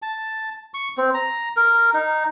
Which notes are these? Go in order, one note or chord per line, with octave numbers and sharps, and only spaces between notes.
A5
C#6
C4
A#5
A#4
D#4